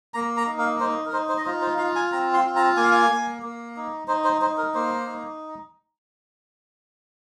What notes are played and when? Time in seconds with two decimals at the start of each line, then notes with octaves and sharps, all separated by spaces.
0.14 A#3 A#5
0.37 A#5
0.47 D#4
0.58 F5
0.80 D#4 C5
1.06 A#4
1.12 D#4 C5
1.29 C5
1.38 D#5
1.46 F4 C5
1.62 C5
1.78 F4 F5
1.96 G#5
2.12 C4 A#5
2.34 C6
2.44 F4
2.56 A#5
2.77 A#3 G#5
2.84 F5
2.91 G#5
3.10 A#3
3.42 A#3
3.76 D#4
4.08 D#4 C5
4.24 C5
4.41 D#4 C5
4.58 A#4
4.75 A#3 C5
5.06 D#4